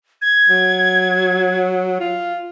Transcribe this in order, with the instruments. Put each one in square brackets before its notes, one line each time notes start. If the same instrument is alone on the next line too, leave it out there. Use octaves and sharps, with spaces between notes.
[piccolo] G#6
[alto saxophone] F#3
F4